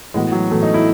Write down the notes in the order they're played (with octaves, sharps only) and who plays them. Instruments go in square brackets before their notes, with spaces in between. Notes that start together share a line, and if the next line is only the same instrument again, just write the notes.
[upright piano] A2 E3 B3 F#4 [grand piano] G#3
[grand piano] F#3
[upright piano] A2 E3 B3 F#4 [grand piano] A3
[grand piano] D#4
E4